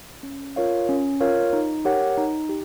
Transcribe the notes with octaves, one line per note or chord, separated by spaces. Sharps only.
C#4
F4 A#4 C#5 F5
C#4
F4 A#4 C#5 F5
D#4
G4 A#4 C#5 F#5
D#4
G4